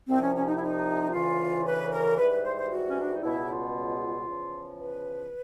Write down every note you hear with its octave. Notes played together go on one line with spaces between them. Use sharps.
C2 C3 F3 C4
C#4
C#4
D#4
E4
D#4
D2 C#3 E3 F4
B4
A#4
G#2 E3 G3 B4
B4
C5
C5
F#4
C#4
D4
D#4
C#2 B2 G3 E4
F4
E2 C#3 F3
B4